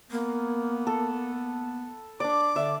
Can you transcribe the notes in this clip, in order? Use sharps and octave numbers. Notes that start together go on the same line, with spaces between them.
A#3 B3
A4
D4 D5 D6
D3 D5 E5